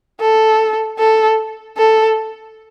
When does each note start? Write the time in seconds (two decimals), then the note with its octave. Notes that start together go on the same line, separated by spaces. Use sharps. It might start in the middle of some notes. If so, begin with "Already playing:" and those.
0.20 A4
0.99 A4
1.78 A4